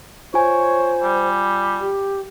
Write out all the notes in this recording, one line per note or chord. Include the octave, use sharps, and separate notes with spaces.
F4 C5 C#5 G#5
G3
G4